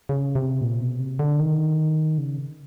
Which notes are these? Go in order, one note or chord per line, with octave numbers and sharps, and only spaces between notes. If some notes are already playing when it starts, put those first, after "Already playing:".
C#3
C3
A#2
B2
C3
D3
D#3
C#3